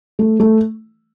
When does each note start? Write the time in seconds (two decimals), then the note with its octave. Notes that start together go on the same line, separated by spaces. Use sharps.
0.19 A3
0.40 A3